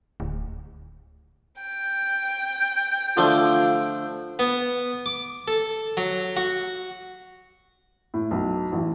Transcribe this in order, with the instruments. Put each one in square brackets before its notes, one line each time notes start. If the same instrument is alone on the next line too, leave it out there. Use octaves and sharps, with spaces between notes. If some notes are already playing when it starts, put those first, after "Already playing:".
[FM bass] D1
[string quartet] G5
[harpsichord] D3 F3 A3 [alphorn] F4
[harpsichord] B3
D6
A4
F#3
F#4
[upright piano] A2
B1
A1